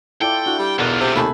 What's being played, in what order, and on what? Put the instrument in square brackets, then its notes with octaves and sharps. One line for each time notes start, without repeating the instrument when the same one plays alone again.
[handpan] E4 F4 D5 [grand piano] A4 [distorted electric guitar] G5
[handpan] D4 E4 [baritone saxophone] F#4
[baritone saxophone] G3
[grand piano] B1 A#4 [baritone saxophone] E2 [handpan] B2 F#5 [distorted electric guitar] D3 F4
[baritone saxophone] C3 [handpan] G#4 E5 [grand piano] C5 E6 G6
[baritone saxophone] D#2 [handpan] C3 A3 [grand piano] G#5 A5 B5